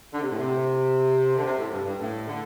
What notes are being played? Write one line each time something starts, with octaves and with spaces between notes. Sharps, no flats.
D3
C3
A2
C3
D3
C3
A2
G2
G2
A2
D3